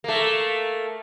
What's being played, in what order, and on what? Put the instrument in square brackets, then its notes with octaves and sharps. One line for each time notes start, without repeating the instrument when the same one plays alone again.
[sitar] A3 A#3